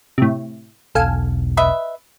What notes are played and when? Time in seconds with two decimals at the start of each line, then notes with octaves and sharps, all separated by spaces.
0.18 A2 C3
0.95 E1 B1 A4 F5 G#5
1.57 B4 D#5 E5